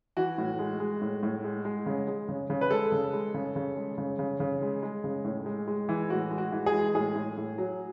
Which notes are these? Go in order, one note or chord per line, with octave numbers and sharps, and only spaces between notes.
E3 F#4
A2
G#3
G#3
A2
A2
G#3
G#3
C#3
G#3
C#3
C#3
B4
G#3 A4
C#3
G#3
C#3
C#3
G#3
C#3
C#3
C#3
G#3
G#3
C#3
A2
G#3
G#3
E3
A2 F#4
G#3
F#4
E3
G#4
G#3
A2 G#4
A2
A2
F#3